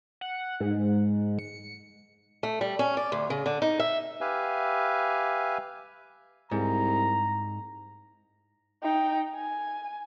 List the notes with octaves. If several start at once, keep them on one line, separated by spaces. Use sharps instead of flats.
F#5
G#2
C#7
A3
G3
C#4
D5
D2
C#3
D3
D#4
E5
G4 B4 E5 F5 G#5
C2 G#2 A#5
D#4 G5
G#5